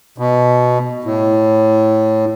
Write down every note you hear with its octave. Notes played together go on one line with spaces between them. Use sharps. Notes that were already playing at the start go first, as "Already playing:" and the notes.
B2
A2